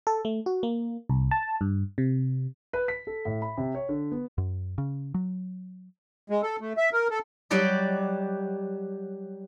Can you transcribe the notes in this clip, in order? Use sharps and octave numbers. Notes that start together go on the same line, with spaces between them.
A4
A3
F#4
A#3
C2
A5
G2
C3
B4
B6
A4
A2
B5
C3
C#5
D3
B3
F#2
C#3
F#3
G#3
A4
A3
E5
A#4
A4
F#3 G3 G4 D5 D#5